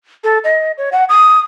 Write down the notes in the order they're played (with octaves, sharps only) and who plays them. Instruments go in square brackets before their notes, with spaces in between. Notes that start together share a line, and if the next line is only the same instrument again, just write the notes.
[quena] A4
D#5
C#5
F#5
D#6